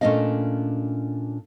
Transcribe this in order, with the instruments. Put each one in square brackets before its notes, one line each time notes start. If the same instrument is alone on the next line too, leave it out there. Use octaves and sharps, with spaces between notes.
[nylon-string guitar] A#2 A3 C#4 D4 D#5 F5